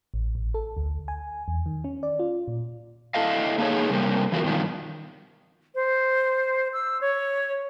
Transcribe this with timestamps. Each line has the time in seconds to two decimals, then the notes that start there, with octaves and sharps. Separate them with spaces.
0.14 A1
0.35 A1
0.54 A4
0.77 D2
1.08 G#5
1.48 E2
1.66 D#3
1.84 C#4
2.03 D5
2.19 F4
2.48 A#2
3.14 E4 A4 D#5 F5
3.58 A3 A#3 D#4 G#4 A4 C#5
3.90 C3 G3 A3 A#3 C4
4.32 E3 F4 F#4 A#4
4.44 G2 B2 D#3 F3
5.75 C5
6.73 E6
7.01 C#5